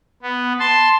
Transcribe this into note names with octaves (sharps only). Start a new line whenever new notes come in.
B3
A5 C6